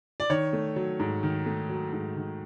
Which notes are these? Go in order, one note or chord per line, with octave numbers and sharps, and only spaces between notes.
D5
D#3 C#5
A3
F#3
G#2
D#3
A3
F#3
G#2
D#3